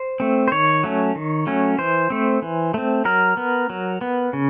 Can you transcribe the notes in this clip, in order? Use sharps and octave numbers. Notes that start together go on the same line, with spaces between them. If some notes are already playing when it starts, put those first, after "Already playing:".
Already playing: C5
A3 C4
C5
D#3 C#5
F#3 A3 C#4
D#3
F#3 A3 C#4
E3 C5
A3 C4
E3
A3 C4
F#3 A#4
B3
F#3
B3
C#3